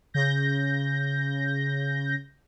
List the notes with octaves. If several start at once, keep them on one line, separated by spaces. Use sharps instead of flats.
C#3 G6 A#6